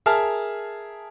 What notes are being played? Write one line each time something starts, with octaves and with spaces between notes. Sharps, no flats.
G#4 A#4 E5 A5 F6